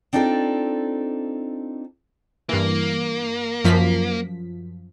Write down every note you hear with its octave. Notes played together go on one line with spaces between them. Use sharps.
C4 D4 D#4 F4 A4 D5
G2 E3 A#3
F#2 F3 B6